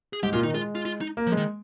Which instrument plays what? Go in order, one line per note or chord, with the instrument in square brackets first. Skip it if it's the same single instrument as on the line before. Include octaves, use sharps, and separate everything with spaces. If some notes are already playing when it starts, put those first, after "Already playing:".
[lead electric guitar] G#4
[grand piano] G#2 [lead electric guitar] G4
[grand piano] A#2 [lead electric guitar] F4
[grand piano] D#3 [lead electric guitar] D#4
[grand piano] G#3 [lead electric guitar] F4
[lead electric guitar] F4
F4
D#4
[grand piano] A#3
[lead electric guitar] F3
[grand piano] G#3
[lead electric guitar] D#3